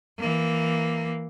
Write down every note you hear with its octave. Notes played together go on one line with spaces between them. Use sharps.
E3 A#3